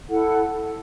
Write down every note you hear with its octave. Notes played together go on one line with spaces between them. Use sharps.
E4 A4 F#5